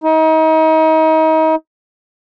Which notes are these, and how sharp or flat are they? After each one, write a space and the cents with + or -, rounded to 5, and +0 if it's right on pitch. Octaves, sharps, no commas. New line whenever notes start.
D#4 +35